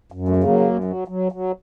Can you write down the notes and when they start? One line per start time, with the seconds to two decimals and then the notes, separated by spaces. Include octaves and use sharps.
0.12 F#2
0.28 A3
0.36 C#3
0.44 F#3 A#3
0.60 F#2
0.84 F#3
1.08 F#3
1.32 F#3